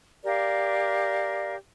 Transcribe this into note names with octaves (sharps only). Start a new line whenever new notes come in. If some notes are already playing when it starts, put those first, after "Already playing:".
G4 A#4 D5 F5